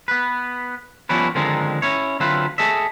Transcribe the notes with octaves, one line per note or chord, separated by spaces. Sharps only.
B3 B4
F3 G3 B3 C#4 E4 B4
D3 D#3 F3 G#3 C4 D#4
C#4 E4 C#5
D3 F#3 C4 E4 F4 B4
G#4 A4 D#5 E5